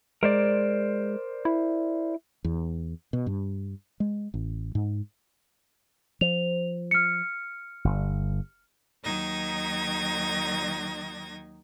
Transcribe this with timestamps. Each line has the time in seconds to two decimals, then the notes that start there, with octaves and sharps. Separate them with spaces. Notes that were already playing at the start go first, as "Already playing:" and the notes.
0.23 G#3 A#4 C5 D5
1.45 E4
2.44 E2
3.13 B2
3.27 G2
4.00 G#3
4.34 A1
4.75 G#2
6.21 F3 F7
6.91 F6 C#7
7.85 G1
9.03 D#2 D#3 F#3 D#4 G#6 A#6